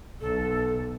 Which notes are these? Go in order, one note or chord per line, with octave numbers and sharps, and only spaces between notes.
B1 A4